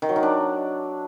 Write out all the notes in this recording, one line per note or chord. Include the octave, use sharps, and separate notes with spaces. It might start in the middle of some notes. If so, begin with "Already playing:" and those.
D#3
F#3
D#3
D4